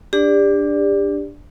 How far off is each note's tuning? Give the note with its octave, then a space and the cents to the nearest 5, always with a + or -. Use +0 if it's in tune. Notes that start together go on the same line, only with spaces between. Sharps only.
D4 +0 G4 +35 D5 +0